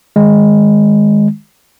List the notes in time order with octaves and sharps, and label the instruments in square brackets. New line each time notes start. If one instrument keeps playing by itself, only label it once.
[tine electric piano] D#3 G#3